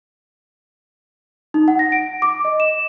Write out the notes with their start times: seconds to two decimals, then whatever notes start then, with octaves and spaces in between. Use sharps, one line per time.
1.54 D#4
1.68 F#5
1.79 A#6
1.92 D7
2.22 D6
2.45 D#5
2.60 E7